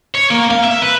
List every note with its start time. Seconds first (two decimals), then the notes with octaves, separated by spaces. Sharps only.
0.15 C#5
0.31 A#3
0.51 F5
0.64 E5
0.82 B4